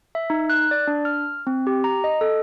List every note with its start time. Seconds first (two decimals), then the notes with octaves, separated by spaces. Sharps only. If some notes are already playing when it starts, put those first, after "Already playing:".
0.15 E5
0.30 D#4
0.50 F#6
0.71 D5
0.87 D4
1.05 F6
1.47 C4
1.67 G4
1.84 A#5
2.04 D#5
2.21 A4